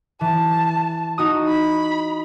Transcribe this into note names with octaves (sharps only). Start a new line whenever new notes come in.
E3 A5
D#4 F#4 D#6
B5